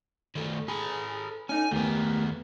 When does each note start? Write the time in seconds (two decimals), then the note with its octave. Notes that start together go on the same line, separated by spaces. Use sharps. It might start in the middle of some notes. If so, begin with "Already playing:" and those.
0.36 D#3 A3
0.68 G#4 A4 B4
1.49 C#4 D#4 A4 G#5
1.71 D#2 A3 B3 G4 A#4